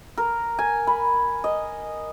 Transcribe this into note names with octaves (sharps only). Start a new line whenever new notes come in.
A#4
G#5
B5
D#5